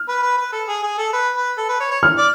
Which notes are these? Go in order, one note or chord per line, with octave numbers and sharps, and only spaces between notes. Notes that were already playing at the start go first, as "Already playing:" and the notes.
Already playing: F6
B4
B4
B4
A4
G#4
G#4
A4
B4
B4
A4
B4
C#5
C#5
F6
D5